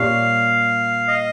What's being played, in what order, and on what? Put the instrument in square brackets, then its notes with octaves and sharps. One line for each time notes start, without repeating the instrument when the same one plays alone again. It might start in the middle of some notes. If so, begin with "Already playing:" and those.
Already playing: [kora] A#2 G3 C#4 [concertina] F5
[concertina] D#5